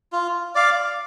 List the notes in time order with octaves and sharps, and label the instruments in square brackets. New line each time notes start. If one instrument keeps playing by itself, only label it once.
[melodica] F4
D5 F5